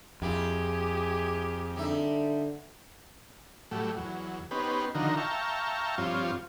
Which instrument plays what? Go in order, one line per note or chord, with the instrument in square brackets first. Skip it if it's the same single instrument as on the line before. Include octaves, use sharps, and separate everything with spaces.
[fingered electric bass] F2 [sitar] A#3 E4 F4 [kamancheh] G4 G#4
[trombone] D3 [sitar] G3 D#4 E5
[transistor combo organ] A2 F#3 G3 A3
E2 F#3
B3 C#4 D#4 G4 B4 C5
D3 D#3 F3 D#4 F#4 A#4
E5 F5 G5 A5 A#5 C#6
G2 F3 C4 F4 C#5